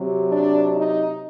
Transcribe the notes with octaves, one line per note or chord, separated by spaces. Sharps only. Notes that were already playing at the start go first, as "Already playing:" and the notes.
Already playing: C3 F#3
D4
D#4